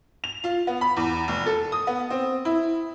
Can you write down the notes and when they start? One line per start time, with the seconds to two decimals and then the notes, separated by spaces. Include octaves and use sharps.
0.24 F7
0.44 F4
0.67 B3
0.81 B5
0.96 E2
1.28 F1
1.46 A4
1.72 D#6
1.87 B3
2.10 C4
2.45 E4